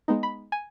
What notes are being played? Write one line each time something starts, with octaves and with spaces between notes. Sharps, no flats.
G#3 B3 D#4
B5
G#5